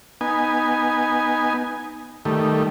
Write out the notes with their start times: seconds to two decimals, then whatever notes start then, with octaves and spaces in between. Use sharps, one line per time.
0.21 B3 D#4 G#5
2.25 D#3 G3 A3